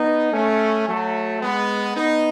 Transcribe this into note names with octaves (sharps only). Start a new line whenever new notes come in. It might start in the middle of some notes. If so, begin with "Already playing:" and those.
Already playing: B3 D#4
A3 C#4
F#3 A3
G#3 B3
B3 D#4